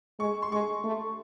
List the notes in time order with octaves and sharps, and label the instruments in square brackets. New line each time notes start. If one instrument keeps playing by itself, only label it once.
[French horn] G#3 [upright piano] C#6
[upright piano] C6
[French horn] G#3 [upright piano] C#6
[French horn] A3